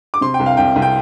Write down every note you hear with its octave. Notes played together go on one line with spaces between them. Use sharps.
D6
C3 C6
G5
C2
F5
C2 G5
C2
G5